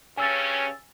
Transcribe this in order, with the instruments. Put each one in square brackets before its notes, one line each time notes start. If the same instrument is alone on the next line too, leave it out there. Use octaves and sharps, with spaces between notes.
[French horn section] G2 C#3 C#4 [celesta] G#5 E6 A6